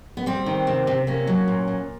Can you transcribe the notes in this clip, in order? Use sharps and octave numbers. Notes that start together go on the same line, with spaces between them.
B3
G3 C4
D#3
C3
C3
A#3 C#4
F#3
A#2
A#2